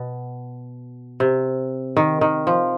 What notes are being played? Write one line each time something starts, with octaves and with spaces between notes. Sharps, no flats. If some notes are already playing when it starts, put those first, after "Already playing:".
Already playing: B2
C3
D#3
D#3
F3